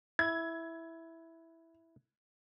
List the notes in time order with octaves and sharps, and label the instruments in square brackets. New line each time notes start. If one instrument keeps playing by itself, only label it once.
[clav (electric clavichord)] E4 [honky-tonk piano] G#6